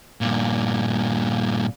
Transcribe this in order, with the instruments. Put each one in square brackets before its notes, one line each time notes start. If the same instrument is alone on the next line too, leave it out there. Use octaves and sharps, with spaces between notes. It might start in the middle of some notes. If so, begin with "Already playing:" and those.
[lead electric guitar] G2 A#2